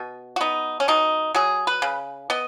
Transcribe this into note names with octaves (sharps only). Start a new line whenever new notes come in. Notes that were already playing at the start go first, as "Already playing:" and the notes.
Already playing: B2
F#4
B3 D#4
C#4
B2 D#4
F#3 G#4
B4
C#3
B3 D#5